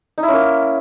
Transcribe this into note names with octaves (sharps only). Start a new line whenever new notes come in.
D#4
E4
C#4
A#3